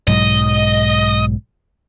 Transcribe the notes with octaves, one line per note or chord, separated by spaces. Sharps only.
B1 G#2 F#3 D#5